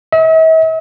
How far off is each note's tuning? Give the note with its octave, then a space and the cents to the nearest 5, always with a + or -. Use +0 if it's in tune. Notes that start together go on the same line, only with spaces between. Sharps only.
E5 -45